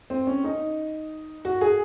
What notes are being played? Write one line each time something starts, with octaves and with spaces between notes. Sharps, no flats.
C4
C#4
D#4
F#4
G#4